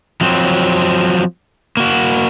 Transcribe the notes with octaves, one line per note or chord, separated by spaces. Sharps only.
F3 F#3 C4
A#3 F#4